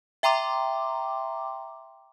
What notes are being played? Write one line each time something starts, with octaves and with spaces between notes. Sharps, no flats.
E5 G5 A#5 C6 D6